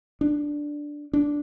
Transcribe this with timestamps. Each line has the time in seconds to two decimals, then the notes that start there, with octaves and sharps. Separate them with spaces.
0.21 D4
1.13 D4